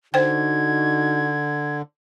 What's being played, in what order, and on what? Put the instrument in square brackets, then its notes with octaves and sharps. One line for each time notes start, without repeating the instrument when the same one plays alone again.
[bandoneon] D3 [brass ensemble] D#4 F#4 [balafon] C5 G5 [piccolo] G#6